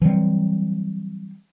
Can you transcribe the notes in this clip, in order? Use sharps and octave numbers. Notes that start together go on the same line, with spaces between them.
E3 F#3 G3 C4